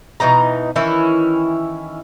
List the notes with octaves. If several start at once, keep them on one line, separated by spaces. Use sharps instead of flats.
B2 E3 D#4 A#5
D#3 E3 C#4 E4